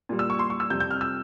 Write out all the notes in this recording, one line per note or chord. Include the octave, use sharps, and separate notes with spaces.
A#2 G3
E6
C#6
C6
C#6
E6
F2 C3 G3 G6
G6
F6
E6